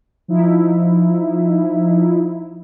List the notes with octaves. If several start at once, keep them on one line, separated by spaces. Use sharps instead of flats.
F3 D#4 E4